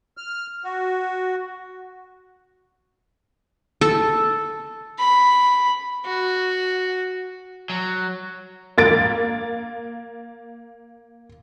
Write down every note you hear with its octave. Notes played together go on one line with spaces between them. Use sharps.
F6
F#4
A4
B5
F#4
F#3
A#3 A6 D7